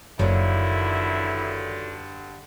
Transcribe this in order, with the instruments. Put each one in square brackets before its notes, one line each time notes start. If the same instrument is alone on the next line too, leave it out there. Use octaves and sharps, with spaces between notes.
[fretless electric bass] F#1 [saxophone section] G2 D3 [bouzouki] D#3 F3 F#3 [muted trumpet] E4